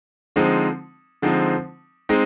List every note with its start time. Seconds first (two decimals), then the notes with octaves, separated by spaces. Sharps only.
0.36 D3 F3 G#3 C4 D#4
1.22 D3 F3 G#3 C4 D#4
2.09 G#3 C4 D#4